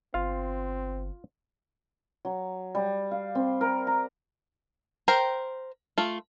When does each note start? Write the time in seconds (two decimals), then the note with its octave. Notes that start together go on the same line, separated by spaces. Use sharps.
0.14 G1 C4 F4 F5
2.25 F#3
2.75 G3
3.11 F5
3.35 C4
3.61 A#4
3.87 A#5
5.08 A#4 C5 G5
5.98 A3 F4